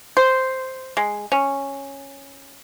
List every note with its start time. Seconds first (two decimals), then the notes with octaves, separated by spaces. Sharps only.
0.17 C5
0.97 G#3
1.32 C#4